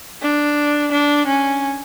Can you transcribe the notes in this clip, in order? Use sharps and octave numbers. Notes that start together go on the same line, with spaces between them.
D4
D4
C#4